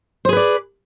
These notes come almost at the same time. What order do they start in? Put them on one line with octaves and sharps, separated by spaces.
C5 G#4 B4 D5